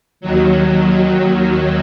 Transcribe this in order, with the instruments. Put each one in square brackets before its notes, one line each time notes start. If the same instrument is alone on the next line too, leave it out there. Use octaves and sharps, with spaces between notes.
[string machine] D#2 D#3 F#3